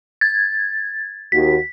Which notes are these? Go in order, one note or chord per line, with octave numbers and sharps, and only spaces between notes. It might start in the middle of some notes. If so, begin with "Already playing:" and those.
G#6 A6
D#2 F#4 B6